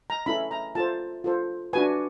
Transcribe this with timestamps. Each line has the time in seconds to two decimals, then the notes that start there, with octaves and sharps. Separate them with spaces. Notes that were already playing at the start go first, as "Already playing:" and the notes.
0.10 A#5
0.26 C#4 E4 A4 B5
0.51 A#5
0.75 F4 A4 C5 A5
1.24 F4 A4 C5
1.73 D4 F#4 B4 G#5